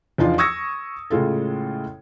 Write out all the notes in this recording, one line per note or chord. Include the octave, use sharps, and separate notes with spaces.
E2 F3 D4 D#4 F4 F5
C#6 D#6 E6 G#6 A#6 C#7
A2 C#3 G#3 F4 A4